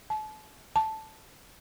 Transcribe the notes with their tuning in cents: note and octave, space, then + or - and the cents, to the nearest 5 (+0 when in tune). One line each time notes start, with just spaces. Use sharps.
A5 -35
A5 -5